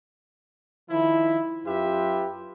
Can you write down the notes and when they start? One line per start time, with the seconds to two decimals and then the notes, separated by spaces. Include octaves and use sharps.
0.90 D#3 F3 E4
1.66 F#2 F4 G4 B4 E5